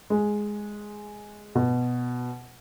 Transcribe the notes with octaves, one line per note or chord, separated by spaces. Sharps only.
G#3
B2